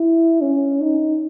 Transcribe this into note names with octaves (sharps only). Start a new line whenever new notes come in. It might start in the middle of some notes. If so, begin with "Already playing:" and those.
Already playing: E4
C#4
D#4